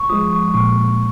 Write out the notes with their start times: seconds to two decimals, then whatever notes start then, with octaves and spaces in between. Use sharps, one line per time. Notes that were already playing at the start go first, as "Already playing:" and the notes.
Already playing: C#6
0.09 F3 G#3 D#6
0.32 C#6
0.54 A#2 C#6